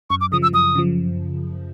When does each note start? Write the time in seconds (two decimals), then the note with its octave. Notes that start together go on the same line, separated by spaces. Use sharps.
0.10 F#2 C#6
0.21 D6
0.32 C#3 F3 D#6
0.43 E6
0.53 F#2 D#6
0.75 C#3 F3